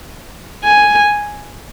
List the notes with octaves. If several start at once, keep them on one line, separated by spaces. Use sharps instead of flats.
G#5